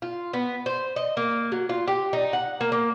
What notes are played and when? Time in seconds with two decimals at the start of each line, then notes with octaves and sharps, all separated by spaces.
0.02 F4
0.33 B3
0.66 C5
0.96 D#5
1.17 A#3
1.52 F#3
1.69 F4
1.87 G4
2.13 D#4
2.33 F#5
2.61 A#3
2.72 A#3